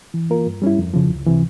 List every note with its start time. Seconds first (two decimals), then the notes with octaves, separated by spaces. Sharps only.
0.14 E3
0.30 A#3 F4 A#4
0.46 G2
0.62 G3 C#4 E4
0.79 F2
0.94 C#3 F3
1.10 C#2
1.26 C3 E3